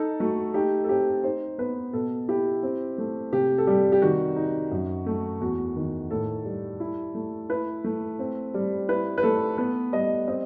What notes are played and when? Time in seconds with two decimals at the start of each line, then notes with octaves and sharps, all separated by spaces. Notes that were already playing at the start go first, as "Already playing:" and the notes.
Already playing: D#4 A4
0.20 A3 F#4
0.54 D#4 G4
0.84 A4
0.89 C4 G4
1.24 D#4 C5
1.58 B3 B4
1.93 B2 A4
2.28 E4 G4
2.63 C4
2.98 A3
3.33 C3 G4
3.58 A4
3.67 G3 G4
3.92 G4
4.02 D#3 F#4
4.36 D#4
4.71 F#2
5.06 A3
5.41 E2 F#4
5.76 D#3
6.11 A2 A4
6.45 G3
6.80 E4
7.15 A3
7.49 E4 B4
7.84 A3
8.19 C4
8.54 G3
8.89 E4 B4
9.18 B4
9.23 A3 A4
9.58 B3 B4
9.93 G3 D#5
10.28 C4 D#5